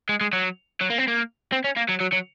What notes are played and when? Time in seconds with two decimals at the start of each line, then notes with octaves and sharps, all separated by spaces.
0.09 G#3
0.21 G#3
0.33 F#3
0.81 F#3
0.90 A#3
0.99 C4
1.08 A#3
1.52 C4
1.64 C#4
1.77 A#3
1.89 F#3
2.00 F#3
2.12 F#3